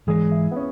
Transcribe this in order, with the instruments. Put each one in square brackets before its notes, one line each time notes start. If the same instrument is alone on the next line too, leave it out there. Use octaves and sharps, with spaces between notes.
[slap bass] G#2 E3 G#3 [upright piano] G#4
[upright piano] E4
B3
C#4